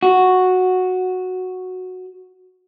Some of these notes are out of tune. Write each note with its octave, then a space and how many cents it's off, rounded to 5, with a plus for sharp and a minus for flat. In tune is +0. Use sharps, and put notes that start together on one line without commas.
F#4 -5